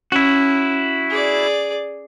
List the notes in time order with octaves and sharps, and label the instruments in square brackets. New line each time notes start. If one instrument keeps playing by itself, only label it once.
[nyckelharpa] C#4 [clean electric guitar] E4 F#4
[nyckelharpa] G#4 D5